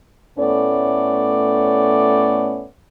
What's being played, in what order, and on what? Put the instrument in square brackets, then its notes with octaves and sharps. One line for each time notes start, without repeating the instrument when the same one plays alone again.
[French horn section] A2 A3 B3 C#4 C#5 D5